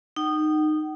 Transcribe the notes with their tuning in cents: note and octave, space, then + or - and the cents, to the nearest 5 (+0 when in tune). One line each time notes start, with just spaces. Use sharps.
D#4 -20 F#5 +45